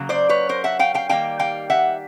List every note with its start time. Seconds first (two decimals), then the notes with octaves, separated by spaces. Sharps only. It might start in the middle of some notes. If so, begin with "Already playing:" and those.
Already playing: C#3 F#3 A#3
0.09 C5 D5
0.29 B4 C#5
0.49 A#4 C5
0.64 E5 F#5
0.79 F5 G5
0.94 F5 G5
1.09 D#3 G3 A#3 F5 G5
1.39 F5 G5
1.70 E5 F#5